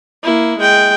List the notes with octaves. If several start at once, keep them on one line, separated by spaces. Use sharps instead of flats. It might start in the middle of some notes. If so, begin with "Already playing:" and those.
A#3 E4
G#3 G5